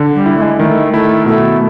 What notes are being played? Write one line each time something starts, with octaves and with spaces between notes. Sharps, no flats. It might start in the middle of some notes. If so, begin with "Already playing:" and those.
Already playing: D3
G3
E4
A3
G#3
D#3 A3
A3 E4
B2 A3